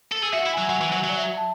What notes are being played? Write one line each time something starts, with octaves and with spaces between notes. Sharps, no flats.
A4
G#4 E6
F#4 E5
F#5
E4
F#3 G#5
F#3 F#5
E3
F#3
F#3
D5
E5
A5